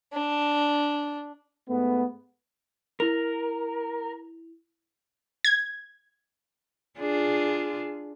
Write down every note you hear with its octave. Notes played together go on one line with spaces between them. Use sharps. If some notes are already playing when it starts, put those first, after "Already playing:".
D4
G#2 A3 B3
E4 A#4 F7
G#6
D4 F4 G#4